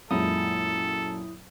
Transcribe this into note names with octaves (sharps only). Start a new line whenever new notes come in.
F#2 A#2 G#3 E4 A4 D#6